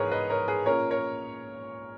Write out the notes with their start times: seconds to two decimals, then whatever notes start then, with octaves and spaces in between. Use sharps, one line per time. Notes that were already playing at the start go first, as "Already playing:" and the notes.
Already playing: G#2 E3 B3 G#4 A#4 B4 C#5
0.11 B4 D#5
0.30 A#4 C#5
0.48 G#4 B4
0.66 A#2 A#3 C#4 A#4 C#5
0.91 A#4 C#5